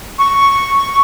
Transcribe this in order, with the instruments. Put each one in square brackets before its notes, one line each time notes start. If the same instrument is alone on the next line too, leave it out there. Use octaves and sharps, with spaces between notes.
[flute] C#6